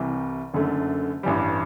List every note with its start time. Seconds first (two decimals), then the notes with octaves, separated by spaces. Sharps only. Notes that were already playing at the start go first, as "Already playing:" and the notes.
Already playing: C2 C3 E3 G3
0.54 F#1 F#2 D3 A3
1.23 A1 G2 E3 G3